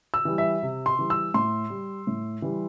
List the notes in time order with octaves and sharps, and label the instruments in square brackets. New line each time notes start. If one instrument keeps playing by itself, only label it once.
[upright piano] E6
E3 G3
E5
C3
C6
E3 G3
E6
A2 C6
G3
A2
E3 G3